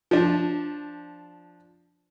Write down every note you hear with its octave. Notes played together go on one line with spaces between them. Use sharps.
F3 D4